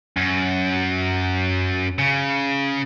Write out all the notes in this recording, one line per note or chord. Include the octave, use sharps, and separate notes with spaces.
F#2
C#3